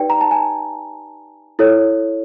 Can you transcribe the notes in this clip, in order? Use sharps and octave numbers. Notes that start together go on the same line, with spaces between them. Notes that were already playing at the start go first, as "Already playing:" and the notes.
Already playing: D#4 G4 B4 D5 G5
A#5
A5
G#5
E4 A4 C#5